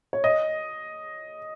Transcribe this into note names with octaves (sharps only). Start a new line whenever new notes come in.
C#5
D#5